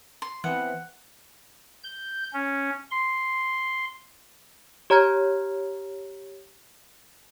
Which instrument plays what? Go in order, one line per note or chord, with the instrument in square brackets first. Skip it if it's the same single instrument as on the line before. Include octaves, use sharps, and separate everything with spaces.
[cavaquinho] C6
[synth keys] E3 B3 C4 [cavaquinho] F#5
[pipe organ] G6
C#4
C6
[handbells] G4 C#5 A#5 F6 G#6